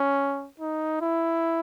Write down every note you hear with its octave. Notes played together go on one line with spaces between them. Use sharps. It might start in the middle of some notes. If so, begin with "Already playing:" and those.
Already playing: C#4
D#4
E4